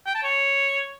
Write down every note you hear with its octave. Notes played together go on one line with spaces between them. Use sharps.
G5
A5
C#5